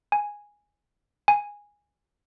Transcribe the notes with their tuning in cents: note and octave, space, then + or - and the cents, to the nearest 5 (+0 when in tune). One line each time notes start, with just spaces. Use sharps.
G#5 -5
G#5 -10